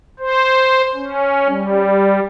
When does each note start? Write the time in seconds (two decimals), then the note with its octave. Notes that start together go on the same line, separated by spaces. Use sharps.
0.19 C5
0.95 C#4
1.48 G3